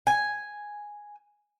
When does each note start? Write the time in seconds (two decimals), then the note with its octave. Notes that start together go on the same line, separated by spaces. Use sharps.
0.07 G#5